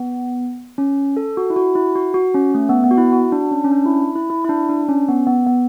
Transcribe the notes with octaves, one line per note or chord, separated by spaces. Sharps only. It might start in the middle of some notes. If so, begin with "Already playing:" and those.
Already playing: B3
C#4
A4
F#4
E4
F#4
E4
F#4
F#4
C#4
A3
B3
B3
F#4
E4
F#4
D4
C#4
C#4
D4
E4
E4
E4
E4
D4
D4
C#4
B3
B3
B3